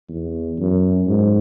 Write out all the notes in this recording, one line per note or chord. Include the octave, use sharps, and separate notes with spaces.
E2
F#2
G#2